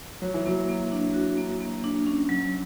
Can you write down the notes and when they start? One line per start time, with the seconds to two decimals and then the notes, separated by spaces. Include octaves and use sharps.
0.22 F#3 F#4
0.34 E3
0.46 F#3 A#3
0.69 A#3
0.92 D4
1.14 F#4
1.37 A#3
1.61 A#3
1.84 D4
2.07 C#4
2.29 F#3